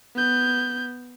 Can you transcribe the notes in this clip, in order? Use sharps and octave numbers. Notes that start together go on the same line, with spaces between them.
B3 G6